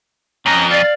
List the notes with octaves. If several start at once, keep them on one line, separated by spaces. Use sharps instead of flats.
F2 C#4 D#5 A#5
D5 F5 A6